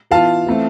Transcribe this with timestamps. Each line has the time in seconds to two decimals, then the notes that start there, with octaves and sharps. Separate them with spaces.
0.11 E3 B3 F4 F5 A5
0.46 E3 A3 C4